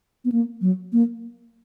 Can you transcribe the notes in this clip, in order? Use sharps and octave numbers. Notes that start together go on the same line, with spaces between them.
B3
A#3
F#3
A#3